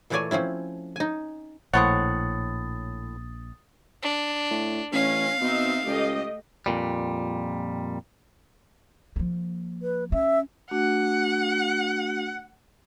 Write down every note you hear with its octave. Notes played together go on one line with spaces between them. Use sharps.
A#2 E3 A3 C#5 D5 G#5
F3 C4 C#4 E4
D#4 G#5
A#1 A2 A#3 C5 C#5 F#5 D#6 A6
D4
A2
A1 C#4 F5
B2 C4 D#4 E5
C#2 A3 G4 D#5
F2 A#2 G3
F3 A#3
B4
C#4 E5
A3 D4 F#4 F#5